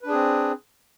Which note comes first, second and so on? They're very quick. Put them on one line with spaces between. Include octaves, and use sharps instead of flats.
B4 D4 G#4 C4